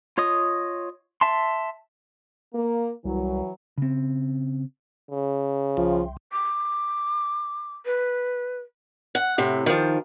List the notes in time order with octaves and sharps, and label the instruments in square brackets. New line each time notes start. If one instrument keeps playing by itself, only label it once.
[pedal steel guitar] F4 C#5 D#5 D#6
E5 A5 C6
[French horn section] A#3
[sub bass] C2 [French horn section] E3 F#3
[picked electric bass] C#3 C4
[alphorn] C#3
[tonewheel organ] C2 [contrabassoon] F3
[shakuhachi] D6
B4
[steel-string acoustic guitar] F#5
A2 C3
D#3 F3